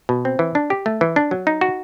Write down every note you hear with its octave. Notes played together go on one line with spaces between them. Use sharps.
B2
C4
E3
D4
G4
A3
E3
D4
F#3
D#4
F#4